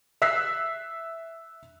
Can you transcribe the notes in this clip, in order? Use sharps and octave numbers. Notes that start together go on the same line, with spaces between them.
E5 E6 F#6 B6 C7